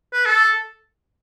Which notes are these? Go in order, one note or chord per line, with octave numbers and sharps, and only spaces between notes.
B4
A4